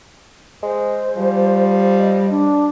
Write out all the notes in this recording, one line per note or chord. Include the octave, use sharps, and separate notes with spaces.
G#3 C5
F3 G3
D#5
D4